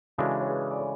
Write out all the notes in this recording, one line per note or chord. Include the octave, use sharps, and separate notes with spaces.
C#3 E3 G#3 D4 F#4 A4
C#5
G#4 B4
D5
A4 C#5